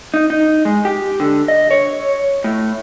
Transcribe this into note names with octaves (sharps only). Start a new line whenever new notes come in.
D#4
D#4
G#3
G4
D3
D#5
C#5
A2